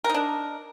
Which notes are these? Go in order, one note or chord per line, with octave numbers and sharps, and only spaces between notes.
D4 D#4 A#4